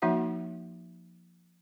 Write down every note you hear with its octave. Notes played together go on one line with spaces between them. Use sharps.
F3 A#3 D#4 F#4 E5 F#5